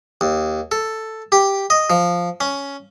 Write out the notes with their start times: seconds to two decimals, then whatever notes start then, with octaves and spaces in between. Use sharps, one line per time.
0.21 D#2
0.72 A4
1.32 G4
1.70 D#5
1.90 F3
2.40 C#4